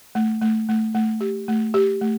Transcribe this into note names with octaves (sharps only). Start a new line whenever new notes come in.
A3
A3
A3
A3
G4
A3
G4
A3